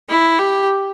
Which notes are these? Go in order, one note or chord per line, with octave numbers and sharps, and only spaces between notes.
E4
G4